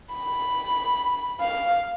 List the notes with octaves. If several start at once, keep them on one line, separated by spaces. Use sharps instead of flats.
B5
F5